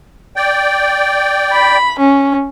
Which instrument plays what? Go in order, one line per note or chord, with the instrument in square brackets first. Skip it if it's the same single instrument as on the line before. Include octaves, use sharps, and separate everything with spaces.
[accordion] D5 G5
[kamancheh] B5
C#4